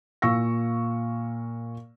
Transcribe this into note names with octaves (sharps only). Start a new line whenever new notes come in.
A#2 F5 C#6 E6 A#6